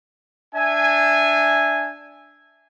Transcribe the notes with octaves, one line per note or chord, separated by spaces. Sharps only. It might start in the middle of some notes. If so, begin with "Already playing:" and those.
D4 E5 G#5